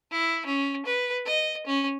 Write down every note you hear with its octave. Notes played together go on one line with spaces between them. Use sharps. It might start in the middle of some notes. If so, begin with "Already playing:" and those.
E4
C#4
B4
D#5
C#4